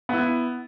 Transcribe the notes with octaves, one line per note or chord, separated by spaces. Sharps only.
B3 E4